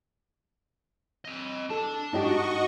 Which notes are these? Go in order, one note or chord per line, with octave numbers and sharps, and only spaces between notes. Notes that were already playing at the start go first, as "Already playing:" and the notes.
C4 D#5
D4 A4 A5
G#2 D#4 F#4 G4 D#5 C#6